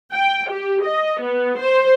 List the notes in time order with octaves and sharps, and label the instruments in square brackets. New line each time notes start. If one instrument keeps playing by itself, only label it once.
[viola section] G5
G4
D#5
B3
C5